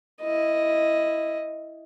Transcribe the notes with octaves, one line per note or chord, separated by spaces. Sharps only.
E4 D#5